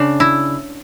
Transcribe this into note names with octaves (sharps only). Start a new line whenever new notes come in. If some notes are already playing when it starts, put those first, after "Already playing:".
Already playing: C#3 D4
E4